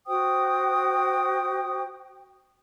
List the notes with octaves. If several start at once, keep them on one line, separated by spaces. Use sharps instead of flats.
F#4 C5 G5 D#6